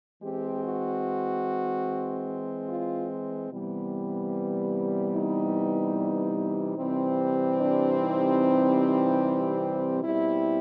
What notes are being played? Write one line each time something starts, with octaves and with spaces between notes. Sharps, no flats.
E3 G#3 C4 G4
F#4
F4
C3 E3 G3 B3
D#4
C3 E3 G3 C4
D4
D#4
B2 G3 C4 E4